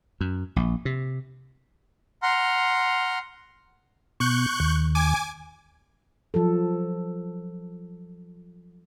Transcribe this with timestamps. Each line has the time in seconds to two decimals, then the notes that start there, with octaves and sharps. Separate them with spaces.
0.21 F#2
0.56 A#1
0.85 C3
2.23 F#5 A#5 C6 F6
4.20 B2 C#6 F#6 G6
4.60 D#2
4.95 G#5 D6
6.34 F3 F#3 A4